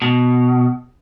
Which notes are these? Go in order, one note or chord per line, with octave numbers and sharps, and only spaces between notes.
B2